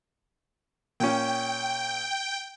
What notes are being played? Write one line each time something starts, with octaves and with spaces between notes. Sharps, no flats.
A#2 C#4 G5